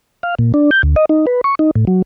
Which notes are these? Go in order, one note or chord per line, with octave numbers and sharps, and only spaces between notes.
F5
A#2
D4
G6
D2
D#5
D#4
B4
C#6
D#4
A2
F#3